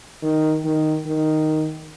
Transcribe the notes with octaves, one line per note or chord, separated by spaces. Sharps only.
D#3
D#3
D#3